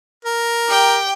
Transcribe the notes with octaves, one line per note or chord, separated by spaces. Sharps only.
A#4
G4 G5